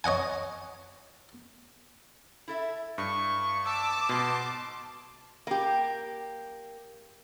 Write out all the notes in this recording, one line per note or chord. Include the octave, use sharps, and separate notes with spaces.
C#5 D#5 F#5 G#5
E4 A4 E5
G2 C#6
A5 D6 E6
G#2 B2 C6
A#3 G4